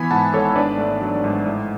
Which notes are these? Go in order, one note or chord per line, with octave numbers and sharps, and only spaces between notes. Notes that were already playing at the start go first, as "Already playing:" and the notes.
Already playing: E3 B3 G#5 B5
G#2 F#5 A5
G#1 A4 C#5
D4 B4 D5
A3
F#3
G#2
A2